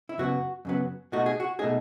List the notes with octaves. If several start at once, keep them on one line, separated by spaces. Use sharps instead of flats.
E4
F#2 C#3 F#3 B3 F#4
F#2 C#3 F#3 B3
B2 A3 D#4 F#4
G#4
F#4
B2 A3 D#4 G#4